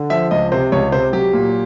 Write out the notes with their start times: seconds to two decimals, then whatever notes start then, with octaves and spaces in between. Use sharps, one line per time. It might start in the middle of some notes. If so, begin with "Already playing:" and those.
Already playing: D3
0.10 F3 E5
0.31 C#2 D#5
0.52 C3 C5
0.72 C#2 C#5
0.92 C3 C5
1.13 F#3 G4
1.33 A#2